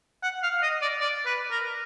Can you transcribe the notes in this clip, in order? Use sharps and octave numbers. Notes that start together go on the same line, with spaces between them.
F#5
F5
D#5
D5
D5
B4
A#4